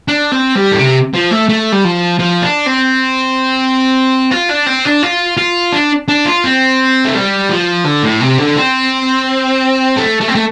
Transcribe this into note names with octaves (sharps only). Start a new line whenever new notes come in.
D4
C4
G3
A2
C3
F3
A3
A3
G3
F3
F3
D4
C4
F4
D4
C4
D4
F4
F4
D4
D4
F4
C4
A3
G3
F3
D3
A2
C3
D3
C4
A3
A3
C4
A3